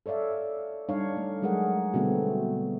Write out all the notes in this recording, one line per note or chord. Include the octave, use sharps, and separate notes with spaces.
A4 C#5 D5 E5 F5
G3 D4 D#4 C#5 F5
A3
F#3 G#3 G#4 A#4 F#5
B2 D3 G3 A3 B3 C4